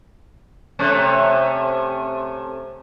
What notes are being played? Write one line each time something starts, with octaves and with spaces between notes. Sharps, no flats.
C3 A3 C#4